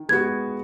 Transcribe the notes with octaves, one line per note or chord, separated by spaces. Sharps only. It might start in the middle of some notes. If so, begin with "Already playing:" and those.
Already playing: D#3
G#3 B3 F#4 G#6